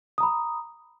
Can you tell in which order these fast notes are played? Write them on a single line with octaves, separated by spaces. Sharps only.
D#6 A#5 B5